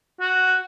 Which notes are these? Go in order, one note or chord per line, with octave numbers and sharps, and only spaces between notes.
F#4